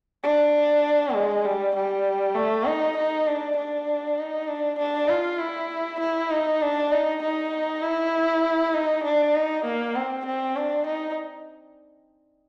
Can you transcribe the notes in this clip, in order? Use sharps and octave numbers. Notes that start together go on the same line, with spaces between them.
D4
G#3
G3
G3
A3
D#4
D#4
D4
D4
D#4
D4
D4
F4
E4
E4
D#4
D4
D#4
D#4
E4
D#4
D4
D#4
A#3
C4
C4
D4
D#4